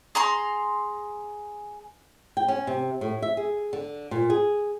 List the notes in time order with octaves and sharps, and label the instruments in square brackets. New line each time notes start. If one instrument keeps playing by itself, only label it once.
[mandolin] G#4 A#5 C6
[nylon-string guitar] G5
C#4
C3
A2
E5
G#4
D3
A#2
G#4